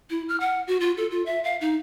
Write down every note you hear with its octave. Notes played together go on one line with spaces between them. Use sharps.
E4
F6
F#5
F#4
F4
A4
F4
E5
F5
D#4